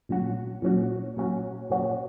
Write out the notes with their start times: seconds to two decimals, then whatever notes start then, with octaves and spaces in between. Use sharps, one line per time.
0.09 A#2 F#3 C#4 F#4
0.62 A#2 F#3 C#4 F#4
1.17 A#2 F#3 C#4 F#4
1.70 A#2 F#3 C#4 F#4